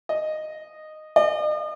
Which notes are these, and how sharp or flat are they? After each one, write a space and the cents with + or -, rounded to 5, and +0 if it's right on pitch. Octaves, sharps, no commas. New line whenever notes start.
D#5 -10
D#5 -45